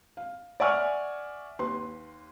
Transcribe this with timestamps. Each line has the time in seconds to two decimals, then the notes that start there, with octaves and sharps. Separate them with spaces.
0.17 F5
0.60 D5 E5 F#5 G#5 C#6 F6
1.59 D#2 B4 C6